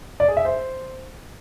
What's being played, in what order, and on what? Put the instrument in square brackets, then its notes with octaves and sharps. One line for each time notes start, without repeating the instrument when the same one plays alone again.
[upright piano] D5
G#4
E5
C5